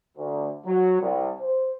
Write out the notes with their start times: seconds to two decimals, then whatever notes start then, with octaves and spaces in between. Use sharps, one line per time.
0.17 D2
0.66 F#3
1.01 C2
1.41 C5